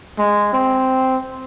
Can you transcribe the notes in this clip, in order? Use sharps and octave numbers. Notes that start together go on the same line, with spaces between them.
G#3
C4